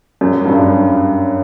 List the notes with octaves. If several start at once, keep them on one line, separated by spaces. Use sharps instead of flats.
F#2
G2
F#2